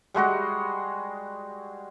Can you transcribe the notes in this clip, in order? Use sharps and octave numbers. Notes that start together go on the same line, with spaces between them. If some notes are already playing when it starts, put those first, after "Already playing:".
G3 G#3 F#4 D#5